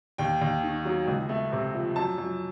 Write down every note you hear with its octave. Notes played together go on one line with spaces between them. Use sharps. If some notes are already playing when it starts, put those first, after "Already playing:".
D#2 G5
D#2
D#3
F#3
C#2
A3
C3
F3
F#2 A5
F#2